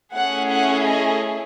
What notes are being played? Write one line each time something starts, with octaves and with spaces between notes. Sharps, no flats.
A3 C#4 E4 G#4 F#5
F#5
D#5